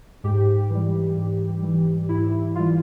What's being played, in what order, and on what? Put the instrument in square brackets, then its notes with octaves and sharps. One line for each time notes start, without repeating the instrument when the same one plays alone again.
[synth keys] G#2 G4
E3 G3
G#2
E3 G3
G#2 E4
E3 G3 F4